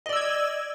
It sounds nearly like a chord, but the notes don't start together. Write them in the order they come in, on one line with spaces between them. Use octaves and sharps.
D#5 D5 E6 G#6